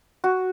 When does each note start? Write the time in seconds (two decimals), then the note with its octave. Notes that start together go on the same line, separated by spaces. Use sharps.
0.24 F#4